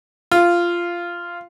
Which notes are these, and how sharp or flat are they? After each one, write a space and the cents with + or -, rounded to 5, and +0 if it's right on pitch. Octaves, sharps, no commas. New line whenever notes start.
F4 -10